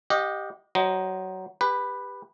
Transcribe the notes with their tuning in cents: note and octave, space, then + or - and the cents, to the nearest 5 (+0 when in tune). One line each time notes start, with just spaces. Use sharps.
G4 +0 D#5 -5 F#5 -40
F#3 +20 C5 +0 D#5 +0
G4 +25 B4 +0